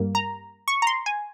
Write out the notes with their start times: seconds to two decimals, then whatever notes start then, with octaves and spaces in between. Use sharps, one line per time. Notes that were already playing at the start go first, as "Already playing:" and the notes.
Already playing: G2 G3 A#3
0.15 A#5
0.68 C#6
0.82 A#5
0.87 C6
1.06 G#5